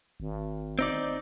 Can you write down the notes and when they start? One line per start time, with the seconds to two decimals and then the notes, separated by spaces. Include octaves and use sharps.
0.20 G#1
0.79 C4 D#4 D5